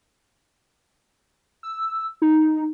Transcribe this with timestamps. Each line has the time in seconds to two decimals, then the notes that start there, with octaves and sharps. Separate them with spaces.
1.63 E6
2.22 D#4